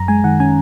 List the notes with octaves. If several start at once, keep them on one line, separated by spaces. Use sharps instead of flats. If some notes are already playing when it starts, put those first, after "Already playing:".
Already playing: F#2 A#5
G#3 G#5
D#3 F#5
C#4 G#5